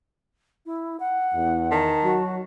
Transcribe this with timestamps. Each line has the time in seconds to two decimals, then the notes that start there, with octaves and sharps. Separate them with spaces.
0.66 E4
1.00 F#5
1.34 E2
1.71 D#3 A5
2.03 F#3 F#4